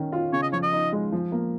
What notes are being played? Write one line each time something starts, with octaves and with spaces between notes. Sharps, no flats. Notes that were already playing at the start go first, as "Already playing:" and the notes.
Already playing: D#3 C#4
F4
C#3 C#5
D#5
F3 C#5
D#5
D#4
G#3
F3
A#3